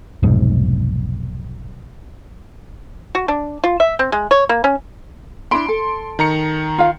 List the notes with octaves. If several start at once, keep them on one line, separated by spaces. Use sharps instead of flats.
F1 B1 G#2
F#4
D4
F4
E5
C4
G#3
C#5
A#3
C#4
D4 E4 B5 C6 D7
A4
D#3 A#5 C#7
F4 F5